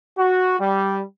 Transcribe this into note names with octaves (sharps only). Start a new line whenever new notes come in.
F#4
G3